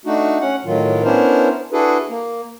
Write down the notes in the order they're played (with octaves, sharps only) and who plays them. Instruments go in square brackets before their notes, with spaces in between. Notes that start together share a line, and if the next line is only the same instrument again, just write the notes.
[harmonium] A3 D4 D#4 F#4
C#4 F#5
A2 D#3 F#3 F4
B3 C#4 D4 E4 A#4 C5
D4 E4 F#4 G#4 A4 B4
A#3